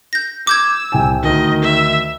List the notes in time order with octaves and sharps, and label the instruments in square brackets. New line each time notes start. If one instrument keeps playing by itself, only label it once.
[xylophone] G6 A#6
[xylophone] D6 G6 G#6 [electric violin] E6
[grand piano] C2 G5 G#5
[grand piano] D2 [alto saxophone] D#3 [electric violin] D#5
[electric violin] E5